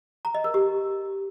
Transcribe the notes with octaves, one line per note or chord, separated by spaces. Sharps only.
A#5
D#5
A#4
G4